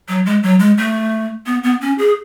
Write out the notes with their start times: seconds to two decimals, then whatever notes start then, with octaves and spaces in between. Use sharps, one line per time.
0.08 F#3
0.26 G#3
0.43 F#3
0.59 G#3
0.78 A3
1.46 B3
1.63 B3
1.81 C#4
1.98 G#4